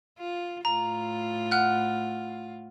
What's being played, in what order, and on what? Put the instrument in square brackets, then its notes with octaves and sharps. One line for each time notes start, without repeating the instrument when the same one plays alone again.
[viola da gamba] F4
[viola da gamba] A2 F4 [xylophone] A#5
[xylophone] F#5 F6 F#6